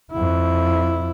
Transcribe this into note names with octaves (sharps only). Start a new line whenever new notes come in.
F2 E4